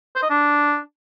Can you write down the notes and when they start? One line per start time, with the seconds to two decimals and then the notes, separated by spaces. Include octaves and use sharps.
0.16 C5
0.23 D#5
0.30 D4